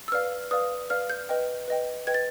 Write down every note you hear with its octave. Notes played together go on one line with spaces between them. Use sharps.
E6
B4 D5 F5 F6
B4 D5 F5 D#6
B4 D5 F5 F6
G6
B4 D#5 G5
B4 D#5 G5
B4 D#5 G5 G#6
A6